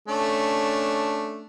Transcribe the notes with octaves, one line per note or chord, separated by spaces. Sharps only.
A3 C#4 D4